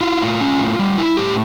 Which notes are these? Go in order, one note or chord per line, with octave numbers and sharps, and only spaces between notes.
E4 F4
A2
C#4
A2
G3
E4
A2 G4